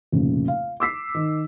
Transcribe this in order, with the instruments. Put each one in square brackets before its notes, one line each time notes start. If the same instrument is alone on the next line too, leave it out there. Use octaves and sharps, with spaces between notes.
[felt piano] F1 A#1 C#3
F5
D6 E6 B6 C7
D#3